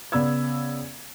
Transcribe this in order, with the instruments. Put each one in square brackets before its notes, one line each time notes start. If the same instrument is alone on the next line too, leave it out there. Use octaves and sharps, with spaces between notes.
[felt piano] C#3 B3 D5 B5 E6 G#6